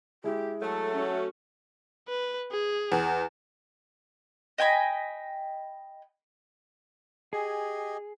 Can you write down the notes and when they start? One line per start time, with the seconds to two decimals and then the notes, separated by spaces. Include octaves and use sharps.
0.24 G#3 E4 G4
0.61 F#3 A3 A4
0.94 C#4 F#4
2.08 B4
2.52 G#4
2.92 E2
4.58 D#5 G5 G#5 B5
7.33 G4 G#4 D#5 G#5